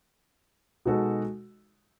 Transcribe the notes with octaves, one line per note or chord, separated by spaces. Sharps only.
B2 G#3 D#4 F#4 A4